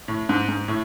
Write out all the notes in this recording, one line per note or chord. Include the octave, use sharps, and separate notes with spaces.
A2
G#2
G#2
A2